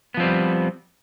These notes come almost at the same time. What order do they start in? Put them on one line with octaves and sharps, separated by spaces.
B3 F3 C4 G3